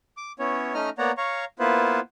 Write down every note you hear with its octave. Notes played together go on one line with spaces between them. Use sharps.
D6
B3 C#4 E4 C#5
A3 C#4 D#4 D#5 A#5 F6
A#3 B3 C#5 D5 F#5 A#5
C#5 F5 A#5 C#6
A#3 B3 E4 F4 B4 C5